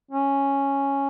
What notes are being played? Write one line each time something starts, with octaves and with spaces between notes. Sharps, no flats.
C#4